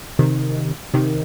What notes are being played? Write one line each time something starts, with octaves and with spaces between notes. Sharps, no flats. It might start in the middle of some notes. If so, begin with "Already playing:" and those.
C3 D#3
C3 D#3